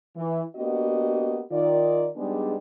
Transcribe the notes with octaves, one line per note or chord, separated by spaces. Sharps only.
E3
A#3 B3 D4 F#4 G4 D#5
D#3 F4 D5
G3 G#3 B3 D4 D#4 G#4